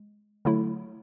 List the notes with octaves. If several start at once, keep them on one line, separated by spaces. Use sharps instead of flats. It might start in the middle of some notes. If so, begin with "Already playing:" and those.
Already playing: G#3
D3 F#3 A3 E4